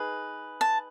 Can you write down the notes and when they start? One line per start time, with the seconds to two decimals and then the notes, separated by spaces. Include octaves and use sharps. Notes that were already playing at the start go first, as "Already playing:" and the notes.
Already playing: D#4 G#4 B4
0.61 A5